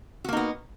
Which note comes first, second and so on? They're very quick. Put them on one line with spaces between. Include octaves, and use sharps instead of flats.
F#4 A#3 D#4 B3